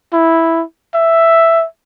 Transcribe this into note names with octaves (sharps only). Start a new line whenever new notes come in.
E4
E5